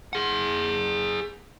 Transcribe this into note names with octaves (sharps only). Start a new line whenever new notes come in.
G#4 F#5